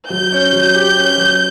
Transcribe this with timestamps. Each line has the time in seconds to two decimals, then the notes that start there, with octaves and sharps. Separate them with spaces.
0.10 F#3 G6
0.32 C#4
0.53 F#3
0.75 G4
0.97 C#4
1.18 F#3